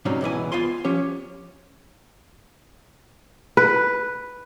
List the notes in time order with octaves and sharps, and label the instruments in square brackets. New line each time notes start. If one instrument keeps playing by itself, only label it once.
[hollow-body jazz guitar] G#2 C3 F#3 G3 C#4 D#4
C#2 B2 E3 G#5
B3 F4 F5 G#5 C6
F3 C#4 G4 C#5
[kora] B4